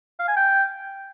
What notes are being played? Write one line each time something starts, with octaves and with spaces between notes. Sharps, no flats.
F5
G#5
G5